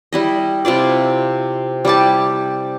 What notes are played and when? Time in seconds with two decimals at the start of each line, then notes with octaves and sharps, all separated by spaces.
0.13 G3 E4 D#5
0.65 C3 E4 F4 D5
1.85 G3 E4 G4 A5